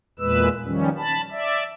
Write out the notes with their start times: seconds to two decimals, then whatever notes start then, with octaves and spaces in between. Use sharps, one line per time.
0.19 E2 A#2 G#3 B4 E6
0.65 D#3 F3 G3 C#4
0.98 A5 B5
1.31 D5 E5